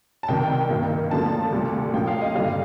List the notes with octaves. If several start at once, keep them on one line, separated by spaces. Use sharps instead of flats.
A5
C2 C3 D#3 G5
G2 D#3 A#3
D2 D3 F3 A#3 A5
D2 C3 G3
A#2 F3 A#3 G5
F5
D#5
G2 D3 G3 F5